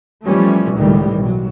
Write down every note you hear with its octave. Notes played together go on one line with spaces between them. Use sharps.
E3 F3 G3 A3 C#4
C#2 A2 D#3 E3 G3
B1 F#3